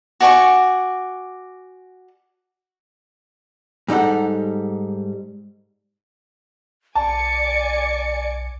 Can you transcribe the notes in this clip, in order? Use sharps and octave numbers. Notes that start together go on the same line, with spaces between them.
F#4 D5 G#5 C#6
G#2 G3 D#4 A4 F#5
B1 D5 G#5 A5 D6 C#7